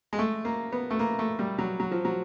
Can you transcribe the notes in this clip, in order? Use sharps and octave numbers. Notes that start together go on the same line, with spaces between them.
G#3
A3
A#3
B3
A3
A#3
A3
G3
F#3
F#3
F3
F#3